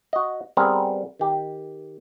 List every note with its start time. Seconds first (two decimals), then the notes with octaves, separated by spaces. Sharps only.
0.13 F#4 D#5
0.57 G3 B3 C4 G#4 A#4
1.20 D#3 G4